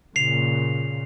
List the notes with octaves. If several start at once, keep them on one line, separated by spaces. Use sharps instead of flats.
A#2 C#3 C7 F7